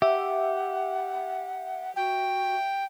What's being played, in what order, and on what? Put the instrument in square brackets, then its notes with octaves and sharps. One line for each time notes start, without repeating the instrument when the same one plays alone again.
[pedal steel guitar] G4 [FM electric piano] E5 [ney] F#5
[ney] F#4 [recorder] G5